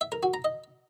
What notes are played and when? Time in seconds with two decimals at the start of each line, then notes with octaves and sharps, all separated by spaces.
0.01 E5
0.12 A#4
0.23 F#4
0.34 A#5
0.45 D#5